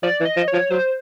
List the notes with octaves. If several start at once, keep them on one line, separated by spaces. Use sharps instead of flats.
F3 D5
E3
D#5
F3
C#5
F3
F#3 C5